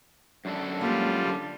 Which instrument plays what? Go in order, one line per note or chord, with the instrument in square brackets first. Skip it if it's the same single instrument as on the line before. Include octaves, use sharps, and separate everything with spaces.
[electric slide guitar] F#2 D4 A4
[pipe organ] G3 F4 [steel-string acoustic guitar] G#3 A#3
[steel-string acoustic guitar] D3